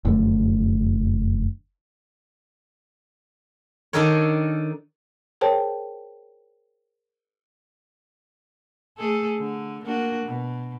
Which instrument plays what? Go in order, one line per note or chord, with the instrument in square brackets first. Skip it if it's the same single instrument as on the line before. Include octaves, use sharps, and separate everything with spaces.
[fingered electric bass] F1 F#2 D3 A3
[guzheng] D#3 D4 D#4 A4 A#4 C#5
[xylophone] G#4 A#4 C5 C#5 G5 A5
[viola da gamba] A3 G#4 A4
D3
A#3 D4 F#4
B2